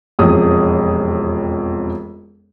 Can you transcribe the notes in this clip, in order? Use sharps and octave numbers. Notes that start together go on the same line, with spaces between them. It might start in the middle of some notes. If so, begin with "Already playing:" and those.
E1 A1 F2 D#6